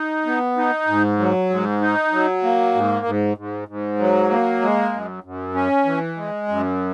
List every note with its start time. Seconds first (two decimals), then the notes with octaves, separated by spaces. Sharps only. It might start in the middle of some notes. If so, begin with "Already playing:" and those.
Already playing: D#4
0.26 B3
0.57 D#4
0.87 G#2
1.19 F#3
1.50 G#2
1.81 D#4
2.12 F#3
2.43 A#3
2.75 G#2
3.06 G#2
3.37 G#2
3.68 G#2
3.99 F#3
4.30 A#3
4.62 G#3
4.92 F#2
5.24 F#2
5.54 C#4
5.85 E3
6.17 G#3
6.48 F#2